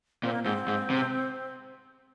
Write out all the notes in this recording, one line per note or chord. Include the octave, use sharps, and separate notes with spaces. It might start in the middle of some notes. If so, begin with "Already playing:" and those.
A#2 C4
A#3
G#2 C4
G#2
C3